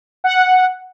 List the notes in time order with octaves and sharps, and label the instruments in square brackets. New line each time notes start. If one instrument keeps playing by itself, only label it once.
[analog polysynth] F#5